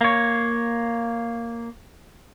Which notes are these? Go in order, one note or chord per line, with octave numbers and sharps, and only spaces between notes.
A#3 C#5